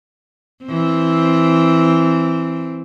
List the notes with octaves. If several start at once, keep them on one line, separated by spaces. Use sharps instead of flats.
E3 C4